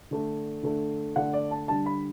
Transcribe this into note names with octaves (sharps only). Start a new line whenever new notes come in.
D3 A3 D4
D3 A3 D4
D3 A3 D4 F#5
D5
A5
D3 G3 D4 A5
B5